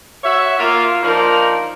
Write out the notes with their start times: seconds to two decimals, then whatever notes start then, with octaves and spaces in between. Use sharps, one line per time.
0.24 F#4 C#5 E5
0.59 A#3 F4
1.03 F3 A#3 D4 D#4 A#4